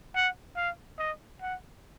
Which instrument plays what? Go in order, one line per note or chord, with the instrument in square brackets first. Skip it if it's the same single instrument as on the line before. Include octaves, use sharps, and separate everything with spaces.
[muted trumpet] F#5
F5
D#5
F#5